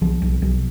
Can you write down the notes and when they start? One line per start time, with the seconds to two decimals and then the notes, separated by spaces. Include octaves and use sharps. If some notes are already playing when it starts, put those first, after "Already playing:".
0.01 B1 F3
0.22 B1
0.42 B1